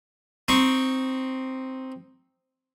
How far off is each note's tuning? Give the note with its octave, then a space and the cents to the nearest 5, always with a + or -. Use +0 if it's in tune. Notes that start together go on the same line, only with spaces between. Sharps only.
C4 +0 D#4 +0 C#6 +0